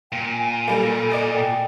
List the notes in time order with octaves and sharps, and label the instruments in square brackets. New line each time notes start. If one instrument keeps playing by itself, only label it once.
[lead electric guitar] A#2 [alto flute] G5
[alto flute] G#5
[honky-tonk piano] G3 A#3 [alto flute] A4
[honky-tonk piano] D5 D#5 G#5
[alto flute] G5